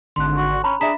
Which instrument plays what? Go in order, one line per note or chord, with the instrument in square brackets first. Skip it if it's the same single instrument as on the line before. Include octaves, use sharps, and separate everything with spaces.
[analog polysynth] G#1 D3 [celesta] C6 F#6
[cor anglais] F#4
[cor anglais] C#4 [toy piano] A#5 B5
[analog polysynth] D4 [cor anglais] G#4 [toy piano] E5 A#5 [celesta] B6 E7